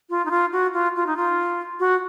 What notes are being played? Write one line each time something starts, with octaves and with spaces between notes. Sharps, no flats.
F4
D#4
F4
F#4
F4
F4
D#4
F4
F#4